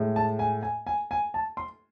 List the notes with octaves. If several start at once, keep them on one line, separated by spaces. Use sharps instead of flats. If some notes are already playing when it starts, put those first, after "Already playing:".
Already playing: A2 G#3
A5
G#5
G#5
G#5
G#5
A5
C6